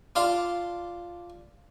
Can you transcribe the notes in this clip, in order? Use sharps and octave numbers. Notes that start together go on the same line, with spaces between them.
D4 F4 F5 C6